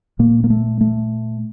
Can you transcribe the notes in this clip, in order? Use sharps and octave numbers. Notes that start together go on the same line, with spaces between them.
A#2 A#3
A#3
A3
A3